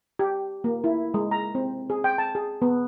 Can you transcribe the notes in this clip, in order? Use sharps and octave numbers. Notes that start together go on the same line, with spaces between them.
G4
A#3
E4
G#3
A#5
C4
G#4
G5
A5
G#4
B3